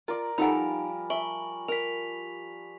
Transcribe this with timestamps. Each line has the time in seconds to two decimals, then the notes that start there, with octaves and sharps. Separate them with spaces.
0.08 F4 A#4 D5
0.38 F3 G3 D#4 A4 D5 F#5 G#5 B5
1.10 E5 G#5 C#6 F#7
1.68 A#4 B6 F7